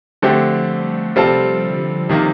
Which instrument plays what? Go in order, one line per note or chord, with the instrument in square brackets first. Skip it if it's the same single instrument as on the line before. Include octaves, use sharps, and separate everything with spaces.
[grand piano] D3 A3 C4 G4 [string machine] F3
[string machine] G3
[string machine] C3 [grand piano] G3 C4 F4 A4
[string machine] D3
[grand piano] C3 D#3 A#3